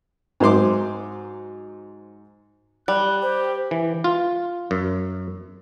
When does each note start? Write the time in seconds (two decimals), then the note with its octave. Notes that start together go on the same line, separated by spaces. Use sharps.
0.40 G#2 F#3 C5 C6 D6
2.88 G3 F#6
3.22 G4 C5
3.71 E3
4.04 F4
4.71 F#2